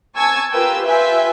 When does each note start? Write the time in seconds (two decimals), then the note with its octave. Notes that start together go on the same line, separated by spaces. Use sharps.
0.16 G#5 A5 C#6 E6 G#6
0.52 F4 G4 A#4 B4 G5 E6
0.86 F4 B4 E5 G5 G#5